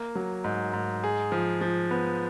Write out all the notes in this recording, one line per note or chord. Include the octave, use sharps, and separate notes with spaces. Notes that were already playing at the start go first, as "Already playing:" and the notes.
Already playing: A#3
F#3
G#2
G#2
G#4
F3
F3
B3